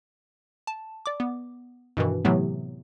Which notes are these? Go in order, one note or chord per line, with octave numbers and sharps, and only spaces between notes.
A5
D5 D6
B3
G2 B2 D#3 E3
A2 C3 E3 F#3 A3 B3